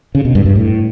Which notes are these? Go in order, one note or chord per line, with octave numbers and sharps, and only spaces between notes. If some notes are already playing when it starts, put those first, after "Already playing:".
C#3
B2
G2
G2
A2